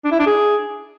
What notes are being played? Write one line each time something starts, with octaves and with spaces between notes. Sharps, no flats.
D4
E4
D4
G#4